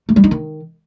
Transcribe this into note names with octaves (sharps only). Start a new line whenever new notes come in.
A3
G3
D#4
D#3